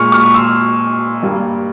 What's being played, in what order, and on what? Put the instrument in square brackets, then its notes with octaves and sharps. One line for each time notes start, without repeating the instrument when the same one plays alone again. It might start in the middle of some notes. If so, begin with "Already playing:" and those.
Already playing: [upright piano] A#2 G#3 C#6 F6
C#6 F6
C6 E6
G2 G3 A#3